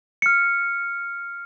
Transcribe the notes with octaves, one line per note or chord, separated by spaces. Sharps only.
F6 C#7